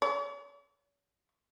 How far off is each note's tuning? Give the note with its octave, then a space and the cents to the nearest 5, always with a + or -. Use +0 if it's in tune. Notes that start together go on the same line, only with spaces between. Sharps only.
C#5 +40